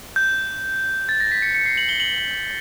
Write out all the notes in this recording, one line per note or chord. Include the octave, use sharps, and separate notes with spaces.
G6
A6
A#6
B6
C#7
C#7
C7
F#7
G7
F#7